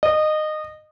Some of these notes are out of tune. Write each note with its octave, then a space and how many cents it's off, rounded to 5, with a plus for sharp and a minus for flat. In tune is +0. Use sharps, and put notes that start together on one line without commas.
D#5 -20